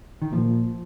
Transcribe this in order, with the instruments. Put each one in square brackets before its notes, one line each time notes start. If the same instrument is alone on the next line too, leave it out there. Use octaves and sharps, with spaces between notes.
[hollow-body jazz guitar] D#3
[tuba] A#2 [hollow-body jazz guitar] F3